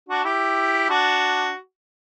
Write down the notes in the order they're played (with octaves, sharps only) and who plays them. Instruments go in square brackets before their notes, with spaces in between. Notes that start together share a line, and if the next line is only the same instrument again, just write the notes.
[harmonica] D4 F#4
E4 G4
D4 F#4